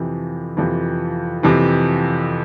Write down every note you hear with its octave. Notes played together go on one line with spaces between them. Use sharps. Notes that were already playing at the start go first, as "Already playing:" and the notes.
Already playing: F2 C3 E3
F2 C3 E3
F2 C3 E3